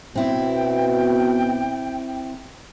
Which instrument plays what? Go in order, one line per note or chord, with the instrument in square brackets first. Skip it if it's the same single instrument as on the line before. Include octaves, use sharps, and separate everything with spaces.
[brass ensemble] B2 [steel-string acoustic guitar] C4 E4 [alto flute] G5